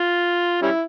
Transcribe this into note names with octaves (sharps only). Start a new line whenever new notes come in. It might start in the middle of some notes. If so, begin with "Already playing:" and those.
Already playing: F4
G3 C#4 E4